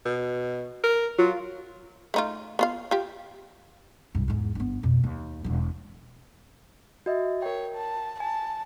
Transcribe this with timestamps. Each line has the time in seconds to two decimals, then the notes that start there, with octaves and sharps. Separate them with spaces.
0.05 B2
0.84 A#4
1.19 F#3 F4
2.14 A3 D#4 F4
2.59 B3 F4 F5
2.91 F4 G4
4.15 C2 G2
4.28 E2 G#2
4.55 G1 B3
4.83 F2 B2
5.04 D#2
5.44 E1 E3
7.06 F#4 D#5 E5
7.42 A#4 C#5 G5
7.75 A5
8.20 G#5 A5